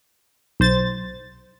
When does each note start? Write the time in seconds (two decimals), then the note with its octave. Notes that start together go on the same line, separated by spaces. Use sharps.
0.60 B1 C5 A6